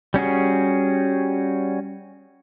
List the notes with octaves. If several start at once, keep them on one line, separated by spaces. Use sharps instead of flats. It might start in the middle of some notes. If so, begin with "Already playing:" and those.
G3 C#4 F#4 G#4